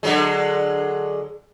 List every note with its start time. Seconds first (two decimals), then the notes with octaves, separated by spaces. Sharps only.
0.03 D3 F#3 G#3